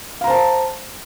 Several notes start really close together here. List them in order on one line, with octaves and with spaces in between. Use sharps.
F5 A#5 C5 A5